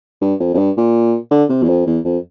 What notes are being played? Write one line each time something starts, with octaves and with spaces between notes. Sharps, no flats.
G2
F2
F2
G2
A#2
D3
C3
E2
F2
E2
F2